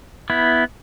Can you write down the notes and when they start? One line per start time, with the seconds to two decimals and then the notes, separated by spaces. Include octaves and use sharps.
0.30 B3 E4